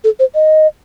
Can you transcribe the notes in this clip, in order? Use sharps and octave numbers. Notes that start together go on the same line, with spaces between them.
A4
C5
D#5